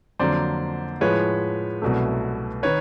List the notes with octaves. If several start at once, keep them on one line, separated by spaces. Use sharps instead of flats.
F2 D3 F#3 A#3 C5 D5
A2 F3 G#3 B4 C#5
C2 B2 F#3 A3
D#3 B4 C#5